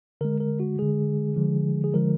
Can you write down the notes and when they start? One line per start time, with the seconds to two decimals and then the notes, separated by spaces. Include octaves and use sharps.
0.21 D3 G#3 A#4
0.40 A#4
0.60 F#4
0.78 D3 G#3 G#4
1.36 D3 F3 G#3
1.84 G#4
1.94 D3 F3 G#3 A#4